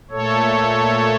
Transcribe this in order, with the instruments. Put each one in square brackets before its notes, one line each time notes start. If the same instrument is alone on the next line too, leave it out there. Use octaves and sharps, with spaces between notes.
[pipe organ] A#2 A3 A4 C#5